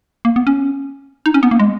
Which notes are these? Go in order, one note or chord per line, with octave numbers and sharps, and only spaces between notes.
A#3
B3
C#4
D#4
C#4
B3
A#3
G#3